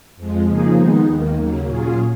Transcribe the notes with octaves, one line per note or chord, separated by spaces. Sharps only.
F2 F3 G#3
C#3 F3 A#3 D#4 G#4
D#3 G#3 B3 D#4
D#2 D#3 A#3
D#2 C#3 F#3 A#3
A#2 F#3 C#4 F4 G#4